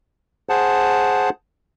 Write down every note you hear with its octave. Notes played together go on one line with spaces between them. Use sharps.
G#4 C5 F#5 A5